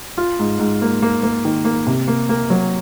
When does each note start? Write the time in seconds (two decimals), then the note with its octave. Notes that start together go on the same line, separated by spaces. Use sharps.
0.18 F4
0.39 G#2
0.59 G#2
0.82 A#3
1.02 A#3
1.23 A#3
1.45 D#3
1.65 A#3
1.87 C3
2.08 A#3
2.29 A#3
2.50 F#3